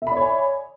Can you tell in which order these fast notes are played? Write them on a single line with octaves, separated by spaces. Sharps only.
E5 B5 D5 C#5 G#5